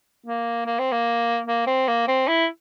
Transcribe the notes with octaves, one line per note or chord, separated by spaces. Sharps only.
A#3
A#3
C4
A#3
A#3
C4
A#3
C4
E4